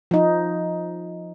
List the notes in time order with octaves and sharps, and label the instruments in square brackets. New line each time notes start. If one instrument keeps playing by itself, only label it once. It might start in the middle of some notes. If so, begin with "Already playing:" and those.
[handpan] F3 D#4